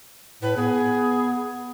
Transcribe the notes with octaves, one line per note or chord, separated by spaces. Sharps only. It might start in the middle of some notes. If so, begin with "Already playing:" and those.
A2 B4
B3 G#4